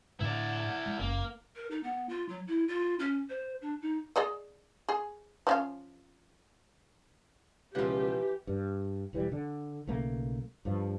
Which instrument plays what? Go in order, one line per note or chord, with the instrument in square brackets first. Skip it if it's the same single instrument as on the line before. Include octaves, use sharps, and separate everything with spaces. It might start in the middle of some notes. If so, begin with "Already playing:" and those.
[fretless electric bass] A2 D3 [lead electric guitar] E4 D5
[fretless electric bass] G#3
[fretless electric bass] F#1 C#4 [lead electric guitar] A#3
[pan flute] A#4
D#4
B3
F4
F#3
E4
F4
C#4
C5
D4
D#4
[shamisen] G#4 D5 D#5
G#4
F3 C#4 F5
[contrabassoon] C#2 [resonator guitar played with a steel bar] B2 F3 [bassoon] E3 [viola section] G4
[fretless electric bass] G2
E1 E3 G3
D3
B1 C#3 A3 A#3
G2 F3